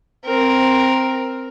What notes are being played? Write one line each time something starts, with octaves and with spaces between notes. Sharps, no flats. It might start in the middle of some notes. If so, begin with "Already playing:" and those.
C4 A#4